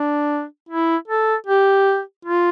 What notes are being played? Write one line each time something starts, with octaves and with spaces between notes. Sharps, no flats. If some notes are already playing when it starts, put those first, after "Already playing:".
Already playing: D4
E4
A4
G4
F4